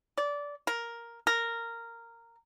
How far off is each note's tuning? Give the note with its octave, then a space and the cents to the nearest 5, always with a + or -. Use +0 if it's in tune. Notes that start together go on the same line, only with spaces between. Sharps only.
D5 -20
A#4 +5
A#4 -10